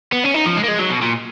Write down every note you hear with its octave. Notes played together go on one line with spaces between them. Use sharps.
B3
C#4
D#4
F3
G#3
A#3
G#3
F#3
B2
A#2